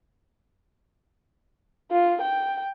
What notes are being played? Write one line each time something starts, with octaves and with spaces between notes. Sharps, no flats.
F4
G5